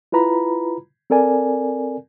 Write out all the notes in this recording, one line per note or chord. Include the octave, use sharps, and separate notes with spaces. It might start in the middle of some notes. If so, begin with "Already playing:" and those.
E4 F4 B4 A#5 B5
C4 A4 A#4 D5 G#5